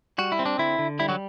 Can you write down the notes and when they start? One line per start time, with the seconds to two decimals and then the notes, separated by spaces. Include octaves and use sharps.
0.18 G3 F#4
0.32 E4
0.39 C4
0.46 D4
0.58 D3 E4
0.78 D3
0.99 G3 E4
1.09 F#3 F#4